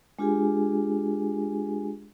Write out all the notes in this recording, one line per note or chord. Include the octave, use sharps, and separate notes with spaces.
G#3 D4 F4 G4 G#4 G#5